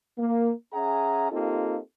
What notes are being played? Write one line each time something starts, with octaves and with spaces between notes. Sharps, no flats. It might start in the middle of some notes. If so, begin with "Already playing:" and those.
A#3
C#4 G#4 E5 F#5 A#5
A#3 C4 D#4 F4 G4 A4